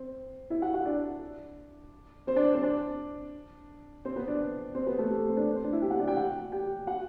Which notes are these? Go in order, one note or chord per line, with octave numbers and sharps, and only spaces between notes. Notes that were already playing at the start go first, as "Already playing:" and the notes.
Already playing: C4 C5
E4 E5
F#4 F#5
F#4 F#5
D4 D5
C4 C5
D4 D5
C4 C5
D4 D5
C4 C5
B3 B4
D4 D5
C4 C5
B3 B4
A3 A4
G4
C4 C5
D4 D5
C4 C5
D4 D5
E4 E5
G4 G5
F#4 F#5
D4 D5
G4 G5
F#4 F#5
G4 G5
F#4 F#5